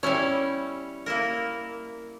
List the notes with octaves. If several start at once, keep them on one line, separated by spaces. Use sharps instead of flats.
G3 C#4 E4 C#5
A#3 E4 A#4